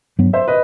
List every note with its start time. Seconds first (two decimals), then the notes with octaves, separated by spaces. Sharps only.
0.19 G2 F#3 B3
0.33 C5 E5
0.48 B4 D#5